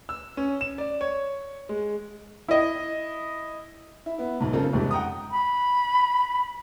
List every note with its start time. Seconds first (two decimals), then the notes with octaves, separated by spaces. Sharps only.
0.09 E6
0.37 C#4
0.61 E7
0.78 D5
1.01 C#5
1.69 G#3
2.48 E4 D#5
4.06 E4
4.18 B3 E4
4.40 B1 G#2
4.53 C#3 C4 F4 A4 A#4
4.73 C2 F2 G#2 C3 G#3
4.91 F#5 G5 A#5 D#6
5.31 B5